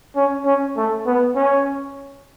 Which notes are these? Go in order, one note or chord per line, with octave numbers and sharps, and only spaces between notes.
C#4
C#4
A3
B3
C#4